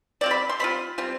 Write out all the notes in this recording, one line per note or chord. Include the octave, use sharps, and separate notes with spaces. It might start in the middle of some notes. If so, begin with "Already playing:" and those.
G3 C4 F4 D5
B5
C6
G3 C4 F4 B5
G3 C4 F4